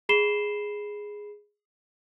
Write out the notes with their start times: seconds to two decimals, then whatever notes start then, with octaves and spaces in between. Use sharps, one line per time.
0.09 G#4 B5 C7 E7 G7